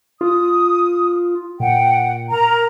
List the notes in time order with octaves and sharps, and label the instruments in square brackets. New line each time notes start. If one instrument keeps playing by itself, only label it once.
[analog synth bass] F4 [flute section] D#6
[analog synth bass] A#2 [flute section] F#5 G5
[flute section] A#4 A#5